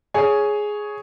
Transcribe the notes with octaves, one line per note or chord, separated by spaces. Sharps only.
G#4 C#5 G#5